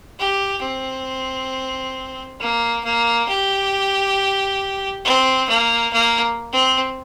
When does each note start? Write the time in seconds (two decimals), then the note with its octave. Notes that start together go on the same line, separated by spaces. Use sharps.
0.19 G4
0.63 C4
2.40 A#3
2.84 A#3
3.29 G4
5.05 C4
5.49 A#3
5.93 A#3
6.52 C4